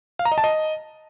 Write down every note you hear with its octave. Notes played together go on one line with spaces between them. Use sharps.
F5
A#5
D#5
A5
D#5